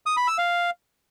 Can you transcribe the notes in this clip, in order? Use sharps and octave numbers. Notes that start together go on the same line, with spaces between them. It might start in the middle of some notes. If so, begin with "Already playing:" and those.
D#6
B5
E6
F5